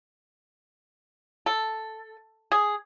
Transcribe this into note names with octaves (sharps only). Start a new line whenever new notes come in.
A4
G#4